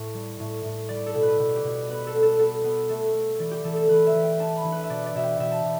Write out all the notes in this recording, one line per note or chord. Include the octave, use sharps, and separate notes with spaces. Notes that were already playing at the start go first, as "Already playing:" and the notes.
Already playing: A2
G3
A2
A2
G3 D5
A4
B2
B4
B2 B4
G4
B2
B3 B4
A4
B3
A4
B3 A4
B3
A3 A4
A3
E3 D5
G4
E3 A4
A4
E3 B4
E5
E3
G5
D4 A5
B5
E3
B4
E5
B2 D5
D5
B2 E5
G5
B2 E5
A5
B2